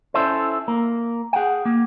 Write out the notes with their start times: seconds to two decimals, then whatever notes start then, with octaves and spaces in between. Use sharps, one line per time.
0.14 C#4 E4 A4 C5
0.68 A#3
1.33 G#4 F#5 G5
1.65 A#3